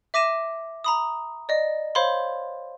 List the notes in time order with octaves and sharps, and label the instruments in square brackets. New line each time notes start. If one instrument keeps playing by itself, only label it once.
[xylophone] E5 D6 A#6 D#7 E7
A#5 B5 D#6
D5 D#5
C5 C#5 F5 B5 C6